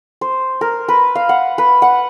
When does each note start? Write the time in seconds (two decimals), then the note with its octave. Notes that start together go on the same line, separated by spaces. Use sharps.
0.21 C5
0.61 A#4
0.88 B4
1.15 F5
1.29 F#5
1.58 B4
1.82 F#5